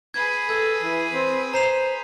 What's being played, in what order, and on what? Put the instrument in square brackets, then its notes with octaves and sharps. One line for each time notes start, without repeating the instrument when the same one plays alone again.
[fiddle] G#4 B4 [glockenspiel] G#6
[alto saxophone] A4 [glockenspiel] G#6
[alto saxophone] E3
C4
[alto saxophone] C5 [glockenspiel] A#5 C7 F7